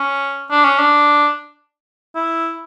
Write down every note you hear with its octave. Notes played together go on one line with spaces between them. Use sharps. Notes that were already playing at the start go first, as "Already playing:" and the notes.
Already playing: C#4
D4
C#4
D4
E4